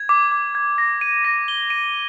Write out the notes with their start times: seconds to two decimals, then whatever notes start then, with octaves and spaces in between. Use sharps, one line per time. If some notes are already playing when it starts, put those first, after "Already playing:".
Already playing: G#6
0.09 D6
0.32 D6
0.55 G#6
0.78 A#6
1.01 D#7
1.25 A#6
1.48 G7
1.70 D#7